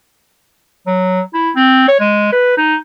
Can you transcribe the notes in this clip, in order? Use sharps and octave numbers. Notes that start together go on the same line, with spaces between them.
F#3
E4
C4
C#5
G#3
B4
D#4